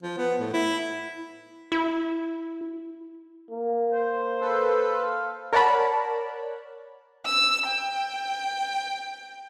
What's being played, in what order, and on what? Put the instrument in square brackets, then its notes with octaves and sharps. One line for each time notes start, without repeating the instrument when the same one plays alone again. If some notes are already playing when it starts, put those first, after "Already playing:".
[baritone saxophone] F3
B3
A2
E4
[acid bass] E4
[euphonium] A#3
[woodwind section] C5
[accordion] A4 B4
[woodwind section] C5 F5
[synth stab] A#4 C#5 D5 F#5 A5 B5
[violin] E6
G5